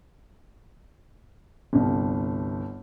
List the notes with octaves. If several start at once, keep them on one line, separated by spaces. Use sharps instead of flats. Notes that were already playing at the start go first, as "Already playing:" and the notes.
G1 C2